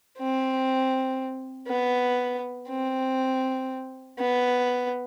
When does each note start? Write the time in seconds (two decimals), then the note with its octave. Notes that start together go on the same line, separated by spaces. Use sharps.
0.18 C4
1.68 B3
2.68 C4
4.19 B3